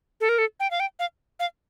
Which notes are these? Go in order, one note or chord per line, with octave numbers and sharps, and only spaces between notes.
A4
A#4
A4
G5
F5
G5
F5
F5